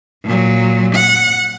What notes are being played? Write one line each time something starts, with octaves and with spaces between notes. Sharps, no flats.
A#2 F#3
F#5